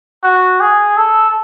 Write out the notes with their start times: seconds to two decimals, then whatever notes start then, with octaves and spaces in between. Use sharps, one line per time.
0.23 F#4
0.61 G#4
0.97 A4